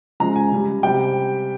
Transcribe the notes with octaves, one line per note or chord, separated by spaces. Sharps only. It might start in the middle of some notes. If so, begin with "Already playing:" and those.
C#3 F3 G#3 A#5
G#5
C#3 G3
C3 G3 G5